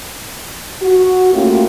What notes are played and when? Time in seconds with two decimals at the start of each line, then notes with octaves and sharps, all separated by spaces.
0.82 F#4
1.33 A3 A#3 C#4 E4 F4 G4